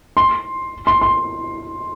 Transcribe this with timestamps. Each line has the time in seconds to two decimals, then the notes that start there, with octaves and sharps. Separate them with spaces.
0.17 C6
0.87 C6
1.01 C6